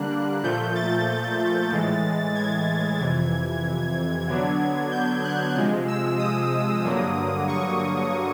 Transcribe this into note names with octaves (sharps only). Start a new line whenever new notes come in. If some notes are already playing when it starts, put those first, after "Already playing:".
Already playing: D3 G3 A#3 D4 F#6
A#2 F3 A3 G6
A6
A2 E3 G#3
G#6
F2 C3 E3
D3 F#3 B3 D4
G6
F#6
C3 F3 G#3
E6
D#6
G2 D3 F#3 A#3
C#6